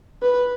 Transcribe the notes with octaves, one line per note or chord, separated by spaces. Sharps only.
B4